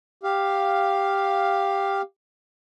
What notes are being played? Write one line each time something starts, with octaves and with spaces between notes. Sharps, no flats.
G4 F5